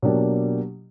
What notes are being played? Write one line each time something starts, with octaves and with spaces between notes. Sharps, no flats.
B2 F#3 A#3 D4 G4